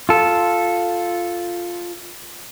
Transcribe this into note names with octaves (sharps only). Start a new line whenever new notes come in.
F4 A4